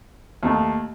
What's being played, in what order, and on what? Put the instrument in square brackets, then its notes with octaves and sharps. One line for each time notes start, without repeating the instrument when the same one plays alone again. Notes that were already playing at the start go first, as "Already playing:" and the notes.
[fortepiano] D#2 D#3 A3